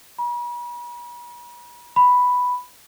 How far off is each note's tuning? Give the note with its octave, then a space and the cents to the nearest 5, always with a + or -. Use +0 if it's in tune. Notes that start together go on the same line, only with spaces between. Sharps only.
B5 -45
B5 +0